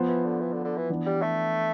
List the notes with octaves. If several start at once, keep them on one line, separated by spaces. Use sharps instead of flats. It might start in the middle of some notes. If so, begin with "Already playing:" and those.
Already playing: F3 B3 F4 C5
E3
D3
E3
D3
D3
E3
E3 B3 D4
G3
A3